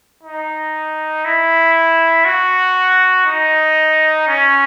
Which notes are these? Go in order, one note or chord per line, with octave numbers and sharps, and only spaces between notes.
D#4
E4
F#4
D#4
C#4